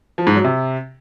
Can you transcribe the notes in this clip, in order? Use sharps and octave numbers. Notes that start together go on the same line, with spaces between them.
F3
G#2
F#3
C3